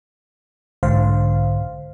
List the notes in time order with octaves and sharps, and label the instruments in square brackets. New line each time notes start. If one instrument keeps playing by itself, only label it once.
[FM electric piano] B1 G#2 D3 C5 F5